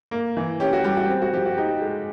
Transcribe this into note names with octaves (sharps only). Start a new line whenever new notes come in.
A#3
E3
C#4 G4
F#4
G3 G4
F#4
C4
F#4
F3 G4
F#4
D#4 G4
G#3